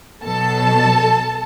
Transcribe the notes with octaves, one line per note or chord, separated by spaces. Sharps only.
B2 F#3 A4 A5